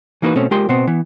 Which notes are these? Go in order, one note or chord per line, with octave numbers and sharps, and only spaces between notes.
E3 A#3 D#4 F4 F#4 B4
B2 A3 C4 C#4
G#3 F4 G4 A#4 C6
B2 B3 C4
E3 B3